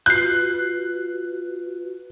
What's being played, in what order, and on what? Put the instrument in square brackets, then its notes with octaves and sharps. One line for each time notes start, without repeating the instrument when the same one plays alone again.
[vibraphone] F4 F#4 B4 [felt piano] F#6 [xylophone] G6 C7